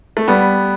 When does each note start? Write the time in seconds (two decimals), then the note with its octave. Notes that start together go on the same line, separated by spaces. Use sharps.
0.17 A3
0.28 G3 B3